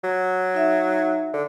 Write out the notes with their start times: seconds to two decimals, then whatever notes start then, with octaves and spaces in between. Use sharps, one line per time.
0.04 F#3
0.54 D#4 E5
1.33 D3